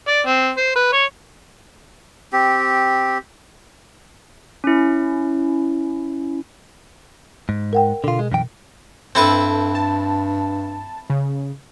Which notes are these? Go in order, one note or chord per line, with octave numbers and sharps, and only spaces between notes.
D5
C4
C5
B4
C#5
C4 G4
C#4 E4
G#2
A#4 F#5 G5
B2 D3 F4
G#3
F#2 E3 G5
G2 C4 E4 A4 B4
A5
C#3